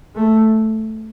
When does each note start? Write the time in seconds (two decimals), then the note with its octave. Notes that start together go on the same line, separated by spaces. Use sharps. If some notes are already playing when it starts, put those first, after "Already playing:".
0.16 A3